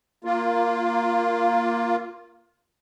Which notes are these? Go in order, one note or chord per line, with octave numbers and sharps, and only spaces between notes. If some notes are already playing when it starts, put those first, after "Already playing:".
A#3 F4